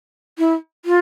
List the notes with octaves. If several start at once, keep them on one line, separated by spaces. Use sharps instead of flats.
E4
F4